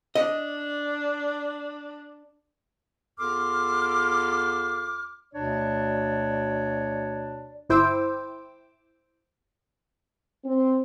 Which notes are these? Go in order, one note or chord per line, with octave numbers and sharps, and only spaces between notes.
D4 D#5
E2 F4 A4 C6 D6 F6
D2 B2 D4 C#5 D5
G1 E4 C5 G5 D6 E6
C4